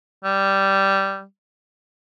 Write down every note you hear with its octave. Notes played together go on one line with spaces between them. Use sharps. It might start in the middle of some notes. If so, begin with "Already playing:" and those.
G3